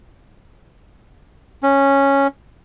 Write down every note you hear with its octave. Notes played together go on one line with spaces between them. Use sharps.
C#4